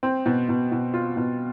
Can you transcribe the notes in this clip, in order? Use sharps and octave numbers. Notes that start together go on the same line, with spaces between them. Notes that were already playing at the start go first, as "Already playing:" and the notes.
C4
B2
B2
B2
F4
B2